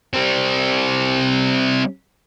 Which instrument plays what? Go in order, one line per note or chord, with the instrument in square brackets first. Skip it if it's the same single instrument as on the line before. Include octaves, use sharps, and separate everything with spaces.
[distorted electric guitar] G3 C4